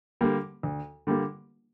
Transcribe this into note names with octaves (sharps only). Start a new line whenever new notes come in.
D3 G3 A#3
D2
D3 G3 A#3